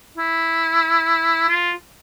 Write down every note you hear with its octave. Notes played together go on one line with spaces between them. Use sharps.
E4
F4